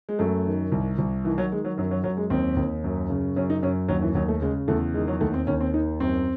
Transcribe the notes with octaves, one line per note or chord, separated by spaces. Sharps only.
G#3
F#2 A3
D#3
C2
C2
D#3 E3
F#3
D#3 G#3
F#3
F#2 F#3
F#3
F#2 F#3
G#3
D#2 C4
D#2
F#2
C#3
F#2 C#4
D#4
F#2 C#4
D#2 F#3
E3
D#2 F#3
A3
C#3 G#3
E2 A3
D#3 G#3
F#3
D#2 A3
C4
D#2 C#4
C4
D#3 D#4
F#2 C4